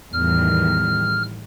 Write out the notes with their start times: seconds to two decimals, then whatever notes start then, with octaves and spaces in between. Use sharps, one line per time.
0.13 E2 A2 D#3 G3 F6